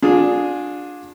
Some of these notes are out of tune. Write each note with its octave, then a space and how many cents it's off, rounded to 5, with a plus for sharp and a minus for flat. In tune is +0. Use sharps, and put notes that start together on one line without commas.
D4 +0 F4 +40 G#4 +0